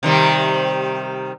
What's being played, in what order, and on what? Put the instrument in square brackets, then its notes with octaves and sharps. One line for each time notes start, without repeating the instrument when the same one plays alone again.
[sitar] C3 D#3 G3